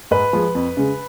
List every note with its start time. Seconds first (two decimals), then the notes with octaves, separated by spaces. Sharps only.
0.11 G#2 B4
0.33 F3 G#3
0.55 F2
0.77 C#3 G#3